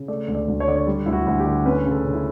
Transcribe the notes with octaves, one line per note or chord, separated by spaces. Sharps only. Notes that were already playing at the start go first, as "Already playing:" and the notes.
Already playing: C#3
A3 D5
D2
D5
D2
C#5
D3 D5
C#5
G3
D2 E4
F#4
D2
G4
D3
C#4 B4
C#3
A4
C#3
E4